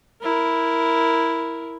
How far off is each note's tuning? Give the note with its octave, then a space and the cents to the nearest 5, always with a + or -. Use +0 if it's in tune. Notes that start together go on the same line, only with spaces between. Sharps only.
E4 +0 A#4 +0